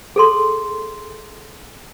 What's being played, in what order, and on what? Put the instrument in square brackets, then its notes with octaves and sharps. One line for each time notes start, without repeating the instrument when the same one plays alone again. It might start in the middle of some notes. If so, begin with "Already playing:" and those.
[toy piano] G#4 A4 C6